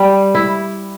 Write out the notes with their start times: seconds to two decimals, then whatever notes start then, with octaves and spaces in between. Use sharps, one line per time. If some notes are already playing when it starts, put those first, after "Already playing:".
Already playing: G3
0.35 E4